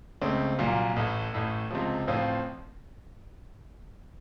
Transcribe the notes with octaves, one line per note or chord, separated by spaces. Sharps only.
C#2 C#3 A3 C4
C2 A#2 F#3 A#3
A1 A2 A3
A1 A2 A3
C#2 C3 F3
A1 A2 F3 C4 F4